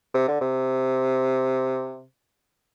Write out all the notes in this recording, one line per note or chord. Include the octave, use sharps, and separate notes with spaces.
C3
D3
C3